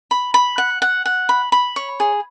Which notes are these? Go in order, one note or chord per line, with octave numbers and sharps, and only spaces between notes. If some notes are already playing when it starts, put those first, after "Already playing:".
B5
B5
F#5
F#5
F#5
B5
B5
C#5
G#4